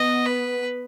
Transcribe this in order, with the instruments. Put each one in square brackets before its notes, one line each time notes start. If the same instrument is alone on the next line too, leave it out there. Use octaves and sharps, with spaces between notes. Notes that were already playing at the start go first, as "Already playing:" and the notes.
Already playing: [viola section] B3 [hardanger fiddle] D#5
[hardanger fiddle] B4